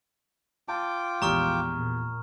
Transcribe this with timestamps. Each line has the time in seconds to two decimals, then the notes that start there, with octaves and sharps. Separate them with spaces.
0.68 F4 G5 A5 D6
1.22 A#1 E2 G#3 G4 A#5 C#6 D#6 F6
1.73 A#2